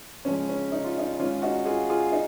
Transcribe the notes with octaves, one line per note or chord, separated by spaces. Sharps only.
C#3 F3 G#3 C#4
C#4
D#4
F4
D#4
D#3 G#3 C#4 F4
D#4 F#4
F4 G#4
F4 G#4
D#4